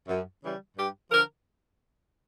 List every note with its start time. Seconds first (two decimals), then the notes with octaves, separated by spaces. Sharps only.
0.08 F#2
0.42 C#3 E3 G3
0.77 G2 G4
1.11 D3 F3 A#4